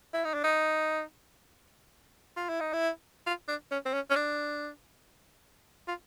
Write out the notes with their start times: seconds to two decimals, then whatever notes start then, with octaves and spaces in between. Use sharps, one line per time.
0.14 E4
0.24 D#4
0.34 D4
0.44 D#4
2.37 F4
2.49 E4
2.61 D#4
2.73 E4
3.26 F4
3.48 D4
3.71 C#4
3.85 C4
3.93 C#4
4.10 C#4
4.16 D4
5.88 F4